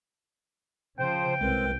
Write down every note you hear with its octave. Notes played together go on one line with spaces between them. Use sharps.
C#3 F3 C5 G5
C2 G#3 C4 A#4 B4